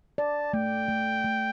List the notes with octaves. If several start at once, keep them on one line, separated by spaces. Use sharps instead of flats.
D5 A5
A3 G5
A3
A3